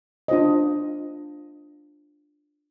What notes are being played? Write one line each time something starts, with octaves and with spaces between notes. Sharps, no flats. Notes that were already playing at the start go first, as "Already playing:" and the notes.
D4 F4 C5 D#5